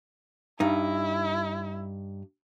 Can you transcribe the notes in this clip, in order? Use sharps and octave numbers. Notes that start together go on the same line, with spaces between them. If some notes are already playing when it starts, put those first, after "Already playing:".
G2 D#4 E4